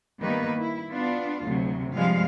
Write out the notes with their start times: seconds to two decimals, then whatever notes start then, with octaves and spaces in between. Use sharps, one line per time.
0.20 D#3 G3 A#3 B3 B4
0.58 E4
0.90 B3 D4 F4
1.45 D2 C3 F#3
1.94 G2 C3 F3 G3 G#3 F5